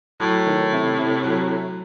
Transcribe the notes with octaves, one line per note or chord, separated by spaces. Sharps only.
A2 F#3
D#3
C3
C3
F#3